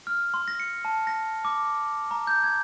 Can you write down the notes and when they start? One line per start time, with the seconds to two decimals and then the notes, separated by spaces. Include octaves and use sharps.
0.07 F6
0.34 C6
0.48 A#6
0.60 C#7
0.85 A5
1.07 A#6
1.45 D6
2.11 A#5
2.27 G6
2.44 G#6